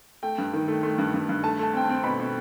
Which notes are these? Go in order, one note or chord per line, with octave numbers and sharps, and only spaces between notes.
A3 G5
G2
D#3
A3
A3
G2
G2
G2
A3 A5
A3 A5
C4 G5
A5
C4
B2 B5
B2